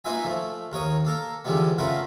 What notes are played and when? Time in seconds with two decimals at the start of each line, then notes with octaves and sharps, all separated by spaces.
0.05 A#3 D#4 F4 B4 E5 G#5
0.25 F3 A3
0.72 D#2 A#4 C#5 D#6
1.05 A#3 A4 A#4
1.45 E2 D3 F3 G3 G#3 B3
1.78 C#3 A3 B3 F4 A#4 B4